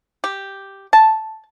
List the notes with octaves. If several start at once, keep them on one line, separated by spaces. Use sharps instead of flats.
G4
A5